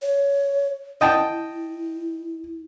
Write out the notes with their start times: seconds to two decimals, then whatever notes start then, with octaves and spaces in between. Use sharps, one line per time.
0.02 C#5
1.01 E4 D#5 G5 A5